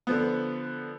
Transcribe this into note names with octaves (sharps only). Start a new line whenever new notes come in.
D3 F3 B3